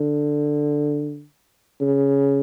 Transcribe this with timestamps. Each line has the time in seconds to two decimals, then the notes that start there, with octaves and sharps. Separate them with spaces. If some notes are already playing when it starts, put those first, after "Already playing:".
Already playing: D3
1.81 C#3